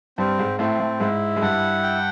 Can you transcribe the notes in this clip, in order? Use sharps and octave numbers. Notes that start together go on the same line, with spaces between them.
G2 G3 C4
G#2 G#3
A2 A3 C4
A2 A3
G#2 G#3 E4
G#3
G2 G3 F#5
G5